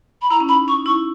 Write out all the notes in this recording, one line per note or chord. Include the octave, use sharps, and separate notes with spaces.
B5
E4 A#5
C#4
D#4 B5
D#4 C#6
E4 C#6